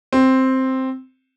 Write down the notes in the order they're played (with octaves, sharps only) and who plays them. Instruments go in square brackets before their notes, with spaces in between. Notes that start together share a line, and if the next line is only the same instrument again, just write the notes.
[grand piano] C4